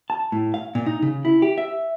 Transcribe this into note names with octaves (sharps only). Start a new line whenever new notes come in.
A5
A2
F5
A#2
D#4
C#3
E4
G4
E5